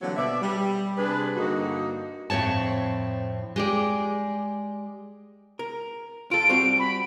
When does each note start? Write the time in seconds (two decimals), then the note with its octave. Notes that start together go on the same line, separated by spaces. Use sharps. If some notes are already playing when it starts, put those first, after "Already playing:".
0.02 D3 E3 F#3 G3 A#3 C4
0.16 B2 D5 E5
0.41 G3
0.97 C3 D4 G#4 B4
1.36 G2 D3 A#3 D#4 F#4
2.30 F2 A2 C4 C#5 A5
3.56 G#3 G4 D5
5.59 A#4
6.31 F4 A4 D7
6.49 G3 C4 F#4
6.79 B5